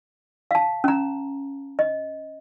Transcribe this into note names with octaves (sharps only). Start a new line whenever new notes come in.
F5 A5
C#4 A#5
D#5